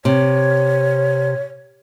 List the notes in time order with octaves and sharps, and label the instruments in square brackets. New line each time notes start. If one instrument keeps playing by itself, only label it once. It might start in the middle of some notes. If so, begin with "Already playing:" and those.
[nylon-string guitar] C3 [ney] C#5